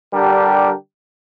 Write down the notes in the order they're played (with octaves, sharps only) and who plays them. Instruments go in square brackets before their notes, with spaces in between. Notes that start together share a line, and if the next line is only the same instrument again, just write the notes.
[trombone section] D3 G3 D4 G4 A#4